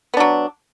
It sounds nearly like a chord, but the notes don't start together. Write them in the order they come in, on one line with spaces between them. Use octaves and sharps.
B3 D4 F#3